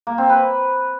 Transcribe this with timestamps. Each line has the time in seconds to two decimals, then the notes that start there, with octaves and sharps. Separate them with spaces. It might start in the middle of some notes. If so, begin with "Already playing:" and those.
0.07 A#3
0.18 C4
0.29 B4